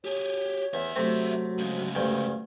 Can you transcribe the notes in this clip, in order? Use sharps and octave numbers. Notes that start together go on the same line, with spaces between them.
G4 G#4 C#5
E2 G3 E5
C3 F#3 A3 C4
G#2 C#3
D2 G2 G3 G5